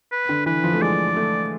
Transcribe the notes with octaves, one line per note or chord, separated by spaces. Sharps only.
B4
D3
E3 B4
F3
A3
G#3 D5
A3